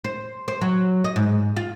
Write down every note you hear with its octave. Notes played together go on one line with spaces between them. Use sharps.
C5
C5
F#3
D#5
G#2
F4